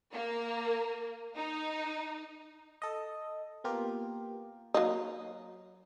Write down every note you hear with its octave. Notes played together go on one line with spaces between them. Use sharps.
A#3
D#4
A4 D#5
A#3 B3 F4 G4 A#4
F#3 A#3 D#4